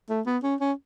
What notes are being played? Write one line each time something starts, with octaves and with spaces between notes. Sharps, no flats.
A3
B3
C#4
C#4